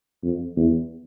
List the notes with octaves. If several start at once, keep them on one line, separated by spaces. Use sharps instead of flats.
F2
E2